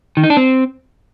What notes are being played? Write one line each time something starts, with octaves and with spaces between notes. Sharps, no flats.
D#3
D#4
D4
C4